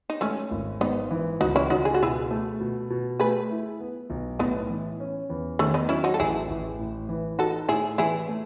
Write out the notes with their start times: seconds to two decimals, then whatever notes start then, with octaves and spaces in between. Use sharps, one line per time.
0.10 D#4
0.21 G#3 A3 C#4
0.51 G#1
0.81 G#2 B3 D#4
1.11 E3
1.41 C#2 D#4 F#4
1.56 C#4 E4
1.70 C#2 D#4 F#4
1.85 G#4
1.94 F#4
2.01 B2 E4 G#4
2.30 A3
2.60 B2
2.90 B2
3.20 A3 G#4 B4
3.51 E4
3.80 B3
4.10 B1
4.39 A2 B3 D#4
4.70 E3
5.00 C#4
5.30 E2
5.59 D#3 A3 C#4
5.74 B3 D#4
5.89 F#3 C#4 E4
6.04 D#4 F#4
6.14 A4
6.19 A1 E4 G#4
6.49 A1
6.79 A2
7.09 E3
7.39 D#4 F#4 A4
7.69 A2 E4 G#4
7.98 E3 E4 G#4
8.28 A3